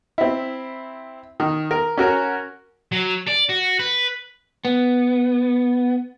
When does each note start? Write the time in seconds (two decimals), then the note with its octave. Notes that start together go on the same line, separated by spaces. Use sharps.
0.18 C4 E4
1.40 D#3
1.71 A#4
1.97 C#4 F#4 A#4
2.92 F#3
3.27 D5
3.49 F#4
3.79 B4
4.65 B3